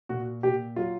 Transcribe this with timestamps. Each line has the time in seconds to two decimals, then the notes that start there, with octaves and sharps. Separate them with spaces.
0.09 A#2 F#4
0.43 A#2 G4
0.76 F#3 F4